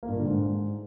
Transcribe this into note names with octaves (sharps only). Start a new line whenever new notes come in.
A#3
G2
A#2
D3
G#2